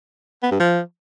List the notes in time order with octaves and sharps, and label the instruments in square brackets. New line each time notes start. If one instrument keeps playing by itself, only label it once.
[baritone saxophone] B3
G2
F3